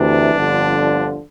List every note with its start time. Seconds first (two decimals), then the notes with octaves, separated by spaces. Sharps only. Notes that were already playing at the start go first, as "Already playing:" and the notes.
Already playing: D2 C3 E3 D4
0.34 G1 F2 D3 F3